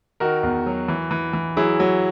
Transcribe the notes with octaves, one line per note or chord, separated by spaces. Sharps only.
D#3 F#4 A#4
E2
F#3
E3
E3
E3
F#3 E4 G#4
F#3